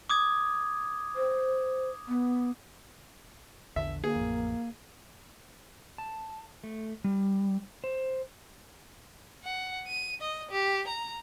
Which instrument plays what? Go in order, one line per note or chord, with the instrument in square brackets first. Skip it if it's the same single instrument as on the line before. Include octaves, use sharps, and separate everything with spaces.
[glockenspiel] D6 D#6 G#6
[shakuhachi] C5
B3
[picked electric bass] A#1 E2 D3 [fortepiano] E5
[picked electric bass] D3 [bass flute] A#3 [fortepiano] G#4
[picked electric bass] A1 F2
[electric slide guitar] A5
A3
G3
C5
[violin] F#5
D#7
D#5
G4
A#5